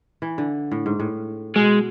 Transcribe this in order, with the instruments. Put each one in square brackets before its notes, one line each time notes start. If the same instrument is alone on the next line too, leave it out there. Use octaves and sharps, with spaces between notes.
[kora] E3
D3
A2
G#2
A2
[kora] B2 [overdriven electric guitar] G#3